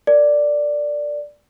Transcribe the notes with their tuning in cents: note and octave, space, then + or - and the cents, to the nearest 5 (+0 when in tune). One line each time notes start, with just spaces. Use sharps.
A#4 +0 D5 +0